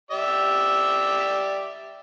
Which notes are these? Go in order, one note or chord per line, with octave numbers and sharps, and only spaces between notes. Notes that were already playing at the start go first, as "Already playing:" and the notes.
G4 D5 E5